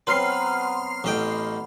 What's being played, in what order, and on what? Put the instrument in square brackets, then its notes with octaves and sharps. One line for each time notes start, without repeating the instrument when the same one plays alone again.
[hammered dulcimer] F#3 B3 C4 [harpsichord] B4 [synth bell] C6 F6 C7
[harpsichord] A1 D#5 G5